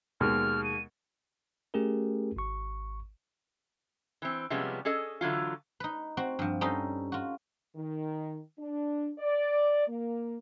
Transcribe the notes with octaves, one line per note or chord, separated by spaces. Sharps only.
D#2 B2 G#3 F6
D#7
A3 C#4 G4 G#4 A#4
G#1 C#6
E3 C4
C3 F3 G3 G#3 B3 C#4
C#4 G#4 A4 D#5
D3 E3 F#3 F4
D#4 B4
C4 F#4
G2 F3
G3 C#4 D#4 A4 C5 D#5
F4 F#4
D#3
D4
D5
A#3